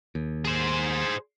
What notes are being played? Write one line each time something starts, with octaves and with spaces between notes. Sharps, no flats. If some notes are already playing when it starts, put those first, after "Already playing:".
D#2
G#4 C5